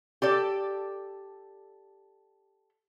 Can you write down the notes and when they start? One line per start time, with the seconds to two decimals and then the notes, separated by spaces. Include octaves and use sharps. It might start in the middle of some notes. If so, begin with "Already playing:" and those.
0.22 G4 A4 D5